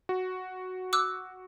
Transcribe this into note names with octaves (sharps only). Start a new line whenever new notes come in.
F#4
D6 E6 F#6